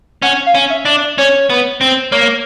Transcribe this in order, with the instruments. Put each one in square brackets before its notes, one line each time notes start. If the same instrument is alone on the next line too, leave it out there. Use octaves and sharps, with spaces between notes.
[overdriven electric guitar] C#4 [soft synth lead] F#5
[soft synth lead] F5
[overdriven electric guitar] C#4
[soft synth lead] E5
[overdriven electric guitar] D4
[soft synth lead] D5
[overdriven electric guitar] C#4 [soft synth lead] C#5
[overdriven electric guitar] B3
C4
[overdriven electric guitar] A#3 [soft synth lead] C#5